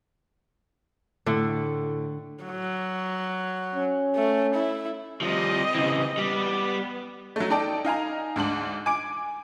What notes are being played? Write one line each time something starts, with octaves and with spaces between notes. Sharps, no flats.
A2 D3 A3
F#3
C#4
A3
E4
F3 G3 C4 G4 D#5
C#3 E3
G3 B3
F#3 A3
D#4 A4 D5 G5
D#4 F5 G#5 A#5
D2 G#2 D4 F#7
G#5 D6 D7